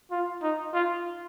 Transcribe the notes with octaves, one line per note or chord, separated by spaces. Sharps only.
F4
D#4
F4